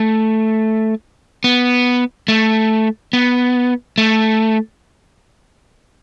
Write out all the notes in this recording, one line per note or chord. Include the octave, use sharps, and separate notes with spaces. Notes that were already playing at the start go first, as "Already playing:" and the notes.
Already playing: A3
B3
A3
B3
A3